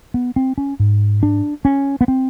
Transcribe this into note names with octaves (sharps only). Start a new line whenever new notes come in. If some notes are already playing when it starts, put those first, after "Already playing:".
B3
C4
C#4
G#2
D4
C#4
B3
C4